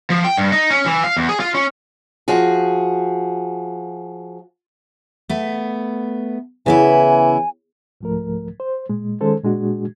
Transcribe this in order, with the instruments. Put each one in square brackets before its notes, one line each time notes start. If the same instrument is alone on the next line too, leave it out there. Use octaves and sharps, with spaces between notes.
[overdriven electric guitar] F3
G5
G2
D#4
C#4
E3
F5
E2
G#4
F4
C#4
[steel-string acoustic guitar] F3 F#4 G#4
A3 B3
[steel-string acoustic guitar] C#3 B3 E4 [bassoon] E3 [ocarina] G#5
[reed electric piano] C2 G#2 F3 A3 A#4
C5
A#2 G#3
D#3 G#3 C#4 A4 C5
A#2 G#3 D4 F#4 G#4